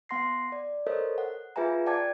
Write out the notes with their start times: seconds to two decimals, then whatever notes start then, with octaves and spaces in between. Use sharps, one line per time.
0.09 B3 F#5 C6 A#6 C7
0.52 D5
0.87 A4 A#4 C5 C#5 D#5
1.18 F#5
1.56 F4 G#4 B4 E5 G#5 A#5
1.86 D5 F#5 G5 A5 D6 G#6